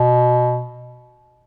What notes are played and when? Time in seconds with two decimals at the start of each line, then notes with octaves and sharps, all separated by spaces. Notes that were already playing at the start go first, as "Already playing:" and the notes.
Already playing: B2